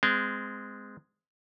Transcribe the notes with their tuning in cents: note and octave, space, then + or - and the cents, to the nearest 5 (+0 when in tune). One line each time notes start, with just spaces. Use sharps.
G#3 +0 C4 -30